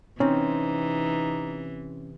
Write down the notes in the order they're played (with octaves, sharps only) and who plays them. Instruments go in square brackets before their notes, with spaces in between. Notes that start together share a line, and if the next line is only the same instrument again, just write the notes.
[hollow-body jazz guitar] C3 C4 [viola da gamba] E3 [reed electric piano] C#4 [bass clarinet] D#4